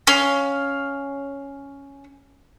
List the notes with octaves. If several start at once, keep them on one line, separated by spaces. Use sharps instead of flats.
C#4 F5